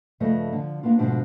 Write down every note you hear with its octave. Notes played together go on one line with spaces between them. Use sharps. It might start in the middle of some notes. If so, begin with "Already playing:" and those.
G2 C#3 F3 A3 B4 D#5
D3 F3
A#3 B3 D4 F4
D2 G#2 B2 F3 D4